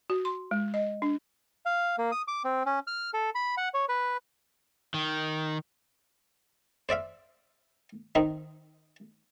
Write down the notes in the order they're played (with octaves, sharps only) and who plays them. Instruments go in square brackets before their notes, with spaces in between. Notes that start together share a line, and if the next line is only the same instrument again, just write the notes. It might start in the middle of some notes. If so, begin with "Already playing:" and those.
[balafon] F#4
C6
G#3
D#5
D4
[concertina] F5
A#3
D#6
D6
C4
C#4
F6
A4
B5
F#5
C#5
B4
[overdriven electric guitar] D#3
[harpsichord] C5 D5 E5 F5
D#3 C4 D#4